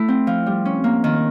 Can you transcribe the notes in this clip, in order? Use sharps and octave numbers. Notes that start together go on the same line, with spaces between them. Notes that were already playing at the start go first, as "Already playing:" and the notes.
Already playing: A3 E4
C4
F3
G3
C#4
A#3
D#3